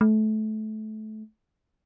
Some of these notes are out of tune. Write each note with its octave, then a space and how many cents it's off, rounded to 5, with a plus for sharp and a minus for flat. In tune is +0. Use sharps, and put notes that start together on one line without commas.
A3 -25